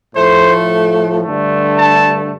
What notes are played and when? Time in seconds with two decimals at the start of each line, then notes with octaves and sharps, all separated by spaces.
0.15 A2 F3 A3 C5
1.23 G2 D3 A3
1.77 A5